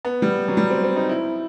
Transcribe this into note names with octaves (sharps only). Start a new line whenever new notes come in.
B3
G3
F#3
G3
C4
C4
D#4
E4